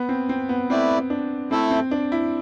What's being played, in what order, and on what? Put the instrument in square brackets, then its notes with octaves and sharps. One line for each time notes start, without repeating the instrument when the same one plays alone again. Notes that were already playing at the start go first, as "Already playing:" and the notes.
Already playing: [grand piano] B3
C4
C4
B3
[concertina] A3 E4 B4 D5 [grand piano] C4
[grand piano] D4
[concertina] A3 E4 A4 [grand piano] C4
[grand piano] C4
D4
E4